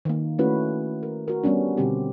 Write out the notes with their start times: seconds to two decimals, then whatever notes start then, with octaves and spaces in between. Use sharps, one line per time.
0.05 D#3 A#3
0.39 A3 C#4 E4 F#4 B4
1.03 A#4
1.28 F#4 A#4
1.43 G3 B3 C#4 D4
1.77 B2 D3 G3 C4 G4